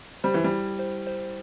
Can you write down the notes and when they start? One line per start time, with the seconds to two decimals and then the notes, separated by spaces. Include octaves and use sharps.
0.24 G3 C5
0.34 E3
0.44 G3
0.51 E4
0.79 C5
1.07 C5